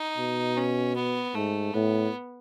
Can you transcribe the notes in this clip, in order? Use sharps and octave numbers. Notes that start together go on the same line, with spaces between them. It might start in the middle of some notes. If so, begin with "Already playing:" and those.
Already playing: D#4
B2
C#4
B3
G#2 A3
A2 B3